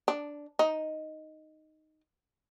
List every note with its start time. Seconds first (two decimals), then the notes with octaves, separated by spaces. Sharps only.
0.08 D4
0.59 D#4